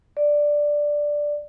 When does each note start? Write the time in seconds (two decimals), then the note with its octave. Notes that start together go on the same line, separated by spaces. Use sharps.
0.17 D5